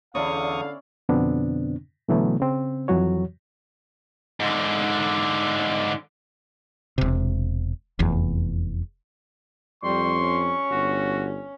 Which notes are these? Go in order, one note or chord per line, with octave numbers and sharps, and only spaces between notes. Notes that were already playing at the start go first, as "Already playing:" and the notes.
E2 D3 C#4 E4 D5 F5 C#6 D#6
F2 B2 D3 B3 C4 D4
B2 D3 E3 F#3 A3 B3
C#3 C4
F2 E3 F#3 F#4 C#5
G#2 D3
E1 C3
F1 E2
F2 G3 C6 C#6
C#4
G1 F#4